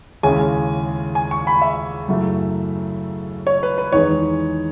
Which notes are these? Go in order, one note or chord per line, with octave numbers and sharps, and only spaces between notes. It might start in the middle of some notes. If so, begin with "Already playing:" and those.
D#2 C#3 G#3 C#4 E4 G#5
G#5
C#6
B5
E5
F#2 C#3 F#3 A3 E4
C#5
B4
B4
E2 D#3 G#3 D#4 C#5